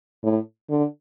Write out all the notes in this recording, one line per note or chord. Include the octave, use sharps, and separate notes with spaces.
A2
D3